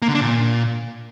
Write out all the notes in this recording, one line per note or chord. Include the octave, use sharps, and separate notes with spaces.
A#3
D3
D4
A#2